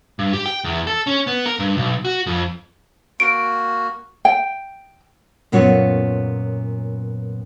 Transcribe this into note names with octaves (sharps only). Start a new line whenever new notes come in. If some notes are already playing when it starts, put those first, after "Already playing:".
G2
G4
G5
E2
A4
C#4
B3
A#4
G2
B1
F#4
F2
A#3 F#4 D7
G5
F#2 A#2 B3 F4 C#5